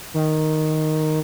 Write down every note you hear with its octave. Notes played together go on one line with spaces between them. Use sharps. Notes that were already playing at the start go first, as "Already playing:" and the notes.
D#3